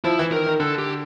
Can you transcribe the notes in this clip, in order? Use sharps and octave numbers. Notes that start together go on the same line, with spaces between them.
F3 E4
E3
D#3 A#4
D#3
D3 A4
G4